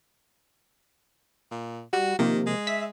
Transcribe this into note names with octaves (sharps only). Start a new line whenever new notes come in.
A#2
G3 F#4
C3 D#3 F3 A#3
G#3
E5 E6 B6